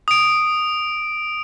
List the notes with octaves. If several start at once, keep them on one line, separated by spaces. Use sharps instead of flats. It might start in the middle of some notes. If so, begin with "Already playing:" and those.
D#6 D7